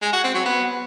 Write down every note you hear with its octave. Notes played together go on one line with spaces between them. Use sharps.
G#3
F#4
C4
F#3
B3